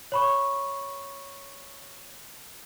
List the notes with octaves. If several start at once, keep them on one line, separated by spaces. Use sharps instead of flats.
C#5 B5 C#6